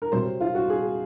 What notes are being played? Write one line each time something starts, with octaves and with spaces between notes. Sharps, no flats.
A#4
C3 F#3 C4 C5
F4
F#4
G#4